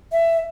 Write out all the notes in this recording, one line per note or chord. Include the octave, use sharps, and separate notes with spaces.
E5